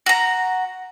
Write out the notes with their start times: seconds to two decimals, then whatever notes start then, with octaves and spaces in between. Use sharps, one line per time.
0.06 F#4 A#5